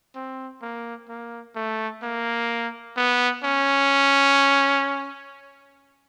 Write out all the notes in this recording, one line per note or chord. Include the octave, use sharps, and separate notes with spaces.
C4
A#3
A#3
A3
A#3
B3
C#4